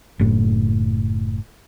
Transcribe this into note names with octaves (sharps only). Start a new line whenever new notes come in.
F#1 A2